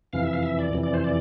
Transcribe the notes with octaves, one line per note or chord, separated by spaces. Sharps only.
F2 C3 E3 F5
E5
F5
E5
D5
F2 C3 E3
D5
C5
D5